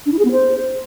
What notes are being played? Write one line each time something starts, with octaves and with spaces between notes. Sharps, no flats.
D4
E4
G#4
B3
C5